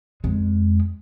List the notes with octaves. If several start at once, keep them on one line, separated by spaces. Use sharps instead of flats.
F2 G#3